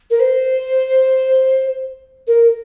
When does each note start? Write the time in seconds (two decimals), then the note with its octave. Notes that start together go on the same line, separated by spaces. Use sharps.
0.10 A#4
0.20 C5
2.27 A#4